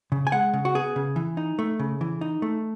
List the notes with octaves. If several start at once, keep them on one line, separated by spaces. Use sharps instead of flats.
C#3
G#5
G#3 F#5
C#3
F#4
B3 G#4
C#3
E3
D#4
A3
C#3
E3
D#4
A3